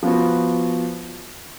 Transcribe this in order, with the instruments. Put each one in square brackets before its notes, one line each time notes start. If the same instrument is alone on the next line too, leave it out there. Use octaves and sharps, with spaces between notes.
[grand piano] F3 B3 F#4